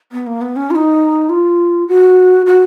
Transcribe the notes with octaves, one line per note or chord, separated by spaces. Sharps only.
B3
A#3
B3
C#4
F4
D#4
F4
F#4
F#4